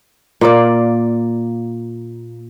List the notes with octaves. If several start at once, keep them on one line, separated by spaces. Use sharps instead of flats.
A#2 A#3 D5